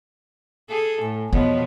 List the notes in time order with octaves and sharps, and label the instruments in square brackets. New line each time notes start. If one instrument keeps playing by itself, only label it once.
[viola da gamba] G#4 A4
[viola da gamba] A2 [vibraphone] G#5
[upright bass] E2 [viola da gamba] B2 F3 B3 [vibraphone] C#5 D#5